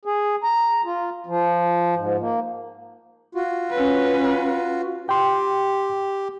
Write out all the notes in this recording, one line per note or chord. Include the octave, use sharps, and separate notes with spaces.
G#4
A#5
F4
F3
G#2
A#3
F4 F#4
C#4 B4
G4 G5 C6